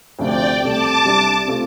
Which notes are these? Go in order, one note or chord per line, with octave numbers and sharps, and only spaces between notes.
D2 C3 F3 D4 D5 G5
C2 C3 A3 A5 D6
C2 C3 G3 D4
C3 A3 F4